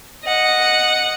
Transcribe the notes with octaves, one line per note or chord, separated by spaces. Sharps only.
D#5 F#5